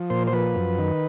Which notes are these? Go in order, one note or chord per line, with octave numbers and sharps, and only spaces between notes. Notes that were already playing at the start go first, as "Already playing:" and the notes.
Already playing: F3
A#2 C5
C5
F3 B4
F#2
D#3